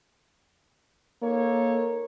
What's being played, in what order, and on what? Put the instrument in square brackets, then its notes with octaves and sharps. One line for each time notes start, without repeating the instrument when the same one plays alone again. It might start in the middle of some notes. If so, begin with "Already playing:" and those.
[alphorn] A#3 [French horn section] D#4 A4 C#5